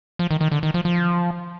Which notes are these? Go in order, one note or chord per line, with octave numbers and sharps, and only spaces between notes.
F3
D#3
D#3
D3
D#3
F3
F3